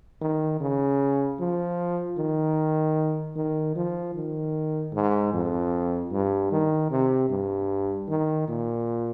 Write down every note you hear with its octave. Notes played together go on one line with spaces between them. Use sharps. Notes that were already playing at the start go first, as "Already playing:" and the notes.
D#3
C#3
F3
D#3
D#3
F3
D#3
G#2
F2
G2
D#3
C3
G2
D#3
A#2